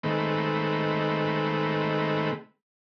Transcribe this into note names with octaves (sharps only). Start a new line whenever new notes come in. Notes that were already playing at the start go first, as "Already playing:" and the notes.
D#3 G#3 A3 C4 B4